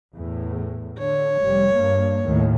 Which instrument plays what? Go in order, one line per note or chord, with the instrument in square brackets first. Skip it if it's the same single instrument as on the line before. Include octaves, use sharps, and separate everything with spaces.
[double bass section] E2 A2
[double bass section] D3 [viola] C#5
[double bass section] F1 G3
G2 A#3
D#2 A2 D#3